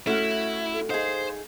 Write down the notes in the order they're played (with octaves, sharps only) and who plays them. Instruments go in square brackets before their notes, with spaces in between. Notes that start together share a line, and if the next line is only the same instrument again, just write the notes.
[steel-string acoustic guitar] A3 [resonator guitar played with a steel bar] C#4 F#4 [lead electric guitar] E4
[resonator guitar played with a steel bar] D#4 G#4 [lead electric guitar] C5 [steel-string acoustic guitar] F5